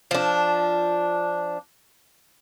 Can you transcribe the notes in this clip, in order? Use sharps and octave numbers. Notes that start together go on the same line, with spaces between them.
F3 D4